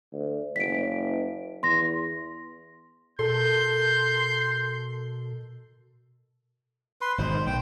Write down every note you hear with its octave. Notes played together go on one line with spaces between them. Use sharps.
D2
F#1 B6 D7
E2 C6 A#6
B2 A4 A#4 C6 G6
B4 C6
G#1 B2 D#3 C5
B1 C5 G5